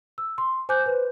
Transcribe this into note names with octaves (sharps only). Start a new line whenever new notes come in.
E6
C6
C5 G#5 D6 F#6 G6
B4 C5